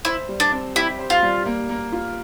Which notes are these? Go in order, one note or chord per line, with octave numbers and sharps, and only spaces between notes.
E4 C5
G3
D4
C4
E4 G4
C5
F4
G3
A#3
A#3
F4